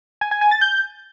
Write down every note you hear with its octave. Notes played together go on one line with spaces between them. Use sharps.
G#5
G#5
G#5
A6
G6